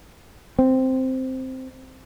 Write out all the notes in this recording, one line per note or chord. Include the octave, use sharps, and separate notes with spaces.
C4